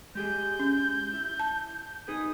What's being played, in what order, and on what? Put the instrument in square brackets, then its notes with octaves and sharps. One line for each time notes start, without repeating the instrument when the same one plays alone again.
[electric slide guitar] G#3 G4 G#4 [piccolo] G6
[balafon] C#4
[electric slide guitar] E4
[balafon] A5
[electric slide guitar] D#4 G#4 B4 [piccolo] D#6